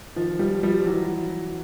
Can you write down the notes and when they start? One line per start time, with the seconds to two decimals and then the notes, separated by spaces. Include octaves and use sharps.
0.16 D#3 F3
0.39 F3 G3
0.63 F3 G3
0.86 E3 F#3